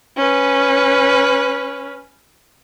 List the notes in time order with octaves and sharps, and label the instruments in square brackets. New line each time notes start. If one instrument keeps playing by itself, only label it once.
[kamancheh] C#4 B4